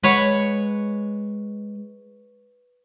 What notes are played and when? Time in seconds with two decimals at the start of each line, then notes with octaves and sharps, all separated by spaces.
0.03 G#3 B4 C#5 F#5